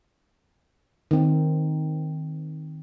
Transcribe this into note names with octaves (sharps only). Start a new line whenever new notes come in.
D#3 C4